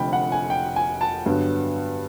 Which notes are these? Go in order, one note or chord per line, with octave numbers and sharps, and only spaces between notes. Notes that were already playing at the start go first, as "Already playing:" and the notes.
Already playing: F1 F2 D3 G5 B5
F#5
G#5
G5
G#5
A5
G2 D3 F#3 B3